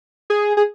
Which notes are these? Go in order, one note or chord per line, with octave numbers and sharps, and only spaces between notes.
G#4
G#4